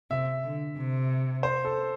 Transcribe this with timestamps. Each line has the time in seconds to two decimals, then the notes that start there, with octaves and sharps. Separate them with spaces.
0.11 C3 E5
0.44 D3
0.77 C3
1.43 C5
1.65 A4